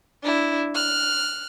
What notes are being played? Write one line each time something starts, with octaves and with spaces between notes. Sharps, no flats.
D4 E4
F6 F#6